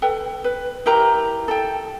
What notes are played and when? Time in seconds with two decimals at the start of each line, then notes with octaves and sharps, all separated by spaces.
0.02 A4 B4 G5
0.44 B4
0.86 E4 G4 A#4 A#5
1.48 A4 G5